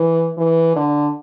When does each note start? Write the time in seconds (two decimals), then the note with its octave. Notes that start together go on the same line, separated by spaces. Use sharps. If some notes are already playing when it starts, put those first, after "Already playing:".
Already playing: E3
0.37 E3
0.76 D3